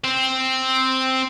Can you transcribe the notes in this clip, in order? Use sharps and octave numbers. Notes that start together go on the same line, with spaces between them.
C4